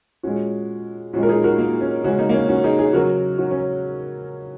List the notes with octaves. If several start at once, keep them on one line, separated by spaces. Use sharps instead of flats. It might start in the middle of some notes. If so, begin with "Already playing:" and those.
A#2 G#3 C#4 F#4
A#2 G#3 C#4 F#4
A#4
D#4 G#4
F#4 A#4
A#3
C#4
C#3 G#3 C#4 F#4
A#3 D#4
A#3
C#4
C#4 F#4
D#4 G#4
G#4 C#5
C#3 F#3 F#4 A#4
C#4 F#4
C#4